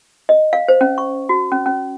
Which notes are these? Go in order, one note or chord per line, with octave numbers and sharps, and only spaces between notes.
D#5
F5
C5
C#4
C#6
F#4
C#4
C#4